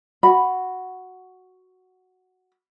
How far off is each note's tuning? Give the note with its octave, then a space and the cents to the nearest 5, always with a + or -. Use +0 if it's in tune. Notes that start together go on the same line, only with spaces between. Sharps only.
F#4 +0 B5 +0